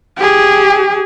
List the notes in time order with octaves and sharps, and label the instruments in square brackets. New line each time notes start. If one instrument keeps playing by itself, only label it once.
[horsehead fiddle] G4 G#4